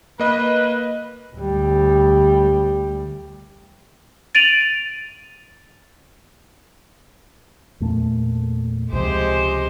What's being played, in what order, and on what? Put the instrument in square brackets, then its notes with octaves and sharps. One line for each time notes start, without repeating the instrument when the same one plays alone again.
[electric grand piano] A#3 D#5 [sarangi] B4
[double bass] D2 G3
[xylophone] A6 D7 D#7 F7 F#7
[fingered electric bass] E2 A#2 A3
[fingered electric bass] C#2 C3 F3 [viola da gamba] G#3 G4 C5